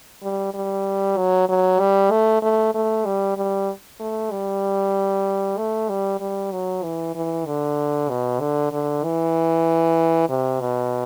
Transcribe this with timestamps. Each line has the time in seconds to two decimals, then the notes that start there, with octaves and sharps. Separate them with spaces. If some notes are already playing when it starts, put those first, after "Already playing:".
0.23 G3
0.54 G3
1.17 F#3
1.49 F#3
1.80 G3
2.11 A3
2.43 A3
2.74 A3
3.05 G3
3.37 G3
4.00 A3
4.31 G3
5.58 A3
5.89 G3
6.20 G3
6.52 F#3
6.83 E3
7.15 E3
7.46 D3
8.09 B2
8.40 D3
8.72 D3
9.04 E3
10.29 C3
10.61 B2